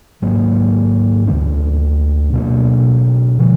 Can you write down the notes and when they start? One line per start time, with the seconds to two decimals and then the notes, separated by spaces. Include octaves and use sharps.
0.22 G#2 F#3 A#3
1.27 D2 D3 G#3 D4
2.33 B2 F#3 A#3 D4
3.39 D3 F3